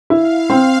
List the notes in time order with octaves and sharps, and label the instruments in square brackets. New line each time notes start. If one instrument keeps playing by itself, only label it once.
[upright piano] E4 [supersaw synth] F5
[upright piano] C4